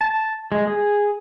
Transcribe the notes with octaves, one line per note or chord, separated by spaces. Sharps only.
A5
G#3
G#4